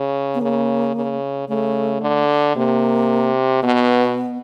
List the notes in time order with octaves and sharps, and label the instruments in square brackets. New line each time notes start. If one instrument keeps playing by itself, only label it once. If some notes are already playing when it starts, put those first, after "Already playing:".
Already playing: [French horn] C#3
[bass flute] B3
[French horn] C#3 [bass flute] A#3
[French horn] C#3
[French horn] C#3 [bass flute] A3
[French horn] D3
[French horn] C3 [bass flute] A#3
[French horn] B2 [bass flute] B3